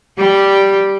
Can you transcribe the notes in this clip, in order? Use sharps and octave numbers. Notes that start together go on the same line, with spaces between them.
G3 G4